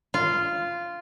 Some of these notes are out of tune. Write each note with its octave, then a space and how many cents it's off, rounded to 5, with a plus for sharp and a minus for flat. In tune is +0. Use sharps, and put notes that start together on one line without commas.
F4 -10